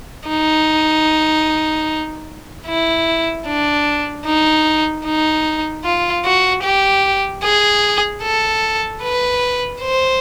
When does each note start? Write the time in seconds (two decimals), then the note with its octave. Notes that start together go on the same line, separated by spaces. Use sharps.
0.29 D#4
2.68 E4
3.46 D4
4.26 D#4
5.05 D#4
5.84 F4
6.25 F#4
6.64 G4
7.43 G#4
8.22 A4
9.03 B4
9.81 C5